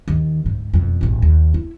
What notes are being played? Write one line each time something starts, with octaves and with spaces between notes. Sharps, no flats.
D#2 D#3
D2 G#2
E1 F2
D1 A1
D#2
E4